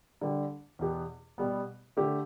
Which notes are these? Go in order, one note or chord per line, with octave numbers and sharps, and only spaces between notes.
D3 G3 D4 G4
E2 B2 B3 G4
B2 G3 B3
D3 A3 G4